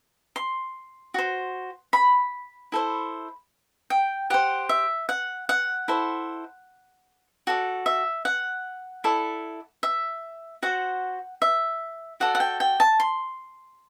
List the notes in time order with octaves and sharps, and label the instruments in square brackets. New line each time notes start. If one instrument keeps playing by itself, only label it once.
[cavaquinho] C6
F#4 C5
B5
E4 A4 C5
G5
G4 C5 F#5
E5
F#5
F#5
E4 A4 C5
F#4 A4 D5
E5
F#5
E4 A4 D5
E5
F#4 C5 F#5
E5
F#4 A4 D5 F#5
F#5
G5
G5
A5
C6